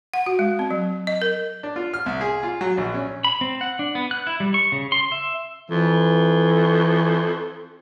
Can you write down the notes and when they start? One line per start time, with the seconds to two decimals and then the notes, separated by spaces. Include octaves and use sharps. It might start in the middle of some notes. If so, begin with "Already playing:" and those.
0.14 F#5
0.26 F#4
0.39 G#3
0.59 C4
0.71 F#3
1.07 D#5
1.22 A#4
1.63 D4
1.76 F4
1.94 F6
2.06 C2
2.21 G#4
2.43 F4
2.61 F#3
2.78 A#1
2.94 C#4
3.24 B5
3.41 C4
3.61 F#5
3.79 D4
3.95 B3
4.11 F#6
4.27 E4
4.40 G3
4.54 C#6
4.72 C#3
4.92 C6
5.12 E5
5.70 F2 E3